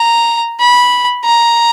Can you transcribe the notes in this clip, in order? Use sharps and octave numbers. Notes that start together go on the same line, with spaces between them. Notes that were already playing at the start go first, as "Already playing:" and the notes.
Already playing: A#5
B5
A#5